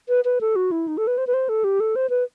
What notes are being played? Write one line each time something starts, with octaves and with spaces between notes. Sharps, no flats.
B4
B4
A4
F#4
E4
D#4
A4
B4
C5
B4
C5
A4
G4
A4
C5
B4